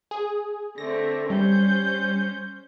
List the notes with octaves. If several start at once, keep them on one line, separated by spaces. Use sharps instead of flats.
G#4
D3 A3 C4 A#6
G3 C#4 C5 G6